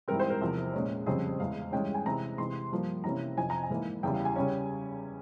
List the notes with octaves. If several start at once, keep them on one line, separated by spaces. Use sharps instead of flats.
G#2 E3 G3 C4 A#4
C5
A#4
E2 C3 F3
A#2 G#3 C#4
F2 C#3 G3 C4 G#4
E2 E3 G#3 F5
G2 E3 G#3 C#4 G5
G#5
C3 E3 G#3 C4 A#5
C3 E3 G#3 C6
G2 F3 A#3
C3 E3 A#3 C#4 A#5
F2 C3 F3 G#5
A#5
G#5
G#2 E3 A#3
E2 C#3 E3 G3 G5
F5
G#5
C#3 G3 C#4